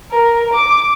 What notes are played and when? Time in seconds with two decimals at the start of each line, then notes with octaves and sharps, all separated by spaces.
0.11 A#4
0.53 D6